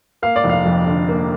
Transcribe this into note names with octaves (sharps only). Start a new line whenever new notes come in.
A#3 F5
D5
F1
F5
F2
D3
A#3